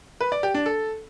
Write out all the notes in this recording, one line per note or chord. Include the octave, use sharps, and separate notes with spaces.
B4
D5
G4
D4
A4